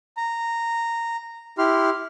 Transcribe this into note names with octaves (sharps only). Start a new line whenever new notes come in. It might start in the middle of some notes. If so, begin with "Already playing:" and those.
A#5
E4 G4 C6 F6